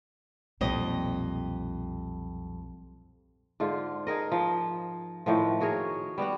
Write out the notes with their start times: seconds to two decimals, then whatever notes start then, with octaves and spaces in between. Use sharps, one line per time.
0.61 B1 F2 A#2 G3 D#5
3.60 G#2 D3 F4
4.07 D#4 G#4 A#4 D#5
4.32 F3
5.26 A2 D#3 F3
5.61 F#4 G#4 A#4 C#5
6.18 G3 B3 F#4 F#5